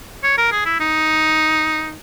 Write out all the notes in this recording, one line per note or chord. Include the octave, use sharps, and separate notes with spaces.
C#5
A#4
G#4
E4
D#4